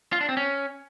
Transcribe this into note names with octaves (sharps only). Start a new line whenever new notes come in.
F4
D4
C4
C#4